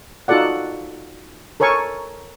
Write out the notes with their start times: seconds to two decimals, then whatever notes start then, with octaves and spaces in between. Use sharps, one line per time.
0.28 D#4 F4 F#4 A4 D5 F#5
1.60 A4 A#4 C#5 G#5 C#6